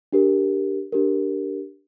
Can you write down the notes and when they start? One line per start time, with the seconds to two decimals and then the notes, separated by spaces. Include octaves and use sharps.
0.13 D4 G4 A#4
0.92 D4 G4 A#4